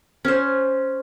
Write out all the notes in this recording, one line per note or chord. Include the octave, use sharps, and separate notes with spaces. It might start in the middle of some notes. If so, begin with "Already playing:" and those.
C#4 C5